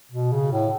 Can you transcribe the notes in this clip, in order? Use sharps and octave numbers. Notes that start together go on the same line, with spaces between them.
B2
C#3
A2